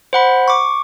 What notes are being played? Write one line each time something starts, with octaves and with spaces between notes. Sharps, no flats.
C5 F#5 B5
C#6 D6